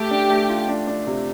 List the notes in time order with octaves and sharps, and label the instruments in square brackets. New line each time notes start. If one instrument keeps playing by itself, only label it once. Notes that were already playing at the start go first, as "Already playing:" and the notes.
Already playing: [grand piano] A3 [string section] G4
[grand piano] D4
A3
F4
D4
D4
C3